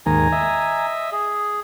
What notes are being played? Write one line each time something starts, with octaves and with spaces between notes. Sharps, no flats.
D#2 G#2 D#3 G#5 A#5
D#5 E5
G#4